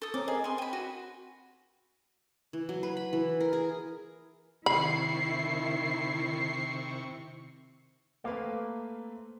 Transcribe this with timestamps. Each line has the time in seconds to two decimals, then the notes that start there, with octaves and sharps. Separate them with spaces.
0.02 A4 D#6
0.14 C4 C#4 A#4 D6
0.28 G#4 A#4 D#5
0.44 C4 B4 G#5 C6
0.58 G5 B5 D#7
0.73 F#4
2.53 E3
2.69 F#3
2.83 B4
2.97 B5
3.13 E3
3.40 A#4
3.53 G#4
4.66 C3 D#3 E4 B5 C#6 C7
8.24 A3 A#3 C4 B4 F5